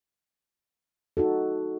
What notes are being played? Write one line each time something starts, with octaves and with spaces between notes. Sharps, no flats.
D#4 F#4 A4